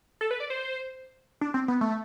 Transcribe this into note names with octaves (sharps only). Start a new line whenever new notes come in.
A4
B4
D5
C5
D4
C4
B3
A3